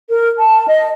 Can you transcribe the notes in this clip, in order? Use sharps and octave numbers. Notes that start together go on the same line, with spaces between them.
A#4
A5
D#5